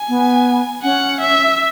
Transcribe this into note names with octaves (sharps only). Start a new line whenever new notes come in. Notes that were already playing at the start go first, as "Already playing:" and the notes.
Already playing: G#5
B3
C#4 F#5
E5